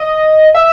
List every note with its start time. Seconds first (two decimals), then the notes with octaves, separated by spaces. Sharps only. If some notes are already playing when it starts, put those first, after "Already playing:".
Already playing: D#5
0.55 E5